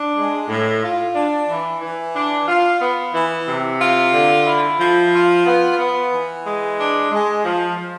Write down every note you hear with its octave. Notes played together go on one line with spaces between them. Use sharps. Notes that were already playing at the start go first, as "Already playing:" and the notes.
Already playing: D4
G#3
A2
F4
D4
E3
E3
D4
F4
B3
E3
C3
F4
D3
E4
F3
F4
B3
B3
E3
G#3
D4
G#3
F3
F3